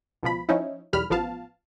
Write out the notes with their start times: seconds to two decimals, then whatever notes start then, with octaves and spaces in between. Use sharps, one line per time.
0.23 C#2 B2 F3 B5
0.49 F3 C#4 D#4 E4
0.93 B1 E2 G3 B5 F6
1.10 A1 F3 B3 F5 A5